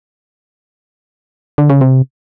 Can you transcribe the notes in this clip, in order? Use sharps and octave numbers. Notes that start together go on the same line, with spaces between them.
D3
C#3
C3